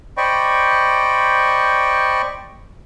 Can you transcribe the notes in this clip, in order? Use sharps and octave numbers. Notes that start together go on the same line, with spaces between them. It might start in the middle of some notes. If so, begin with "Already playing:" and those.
C5 D5 D#5 G5 B5 C#6